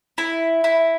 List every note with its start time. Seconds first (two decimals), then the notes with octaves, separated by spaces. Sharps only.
0.18 E4
0.64 E4